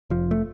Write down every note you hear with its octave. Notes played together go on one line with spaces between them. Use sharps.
F1 F3
A3